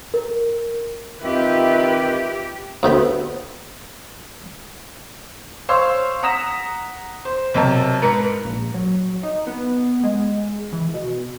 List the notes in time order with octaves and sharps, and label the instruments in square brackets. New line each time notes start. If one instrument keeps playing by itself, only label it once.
[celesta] A#4
[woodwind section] D#3 C4 [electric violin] F4 B4 [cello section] G4 [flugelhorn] E5
[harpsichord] D2 C3 B3 B5
[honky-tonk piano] C5 C#5 F5 C6 E6
F#5 A#5 D#6 A#6 B6 E7
C5
B1 C3 A#4 A5
G#2 A#4 B4 C#7
[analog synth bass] A#1
F#3
D#4
B3
G#3
E3
B2